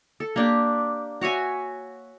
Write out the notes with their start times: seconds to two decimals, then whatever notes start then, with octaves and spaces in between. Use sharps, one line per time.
0.20 A4
0.36 A#3 D4 G4
1.21 F#4 C#5 E5 G#5